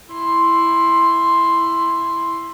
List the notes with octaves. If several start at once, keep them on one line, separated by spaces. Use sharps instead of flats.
E4 C6